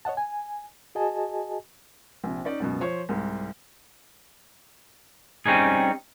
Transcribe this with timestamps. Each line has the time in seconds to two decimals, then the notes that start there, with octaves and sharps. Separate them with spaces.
0.05 C#5 D#5 F#5 A5
0.17 G#5
0.95 F#4 G#4 D#5 G#5 A5
2.24 A#1 C3
2.45 C#4 D#4 D5
2.60 C#2 F#2 B2
2.80 F3 C5 C#5 C#6
3.09 C2 G#2
5.46 G3 C4 C#4 D#4 G#4